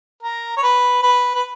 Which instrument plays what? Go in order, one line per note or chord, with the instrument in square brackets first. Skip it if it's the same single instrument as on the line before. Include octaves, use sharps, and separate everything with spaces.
[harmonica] A#4
C#5
B4
B4
B4